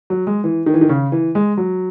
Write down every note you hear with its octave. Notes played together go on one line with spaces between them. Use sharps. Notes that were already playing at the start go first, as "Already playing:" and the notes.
F#3
G#3
E3
D#3
E3
D#3
C#3
E3
G#3
F#3